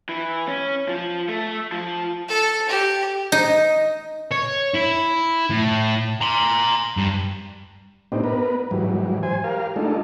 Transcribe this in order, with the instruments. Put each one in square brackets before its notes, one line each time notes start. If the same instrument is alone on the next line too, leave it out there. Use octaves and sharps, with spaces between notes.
[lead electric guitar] E3
C#4
F3
A3
F3
[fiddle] A4
G4
[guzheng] D#4
[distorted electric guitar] C#5
E4
A2
A#5 C6
G2
[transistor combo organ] A2 B3 C4 D4 D#4 G4
B3 A#4 B4
G#2 E3 F#3 G3
C5 G#5
G4 A#4 F5
G#3 A3 D4 D#4 F4 A4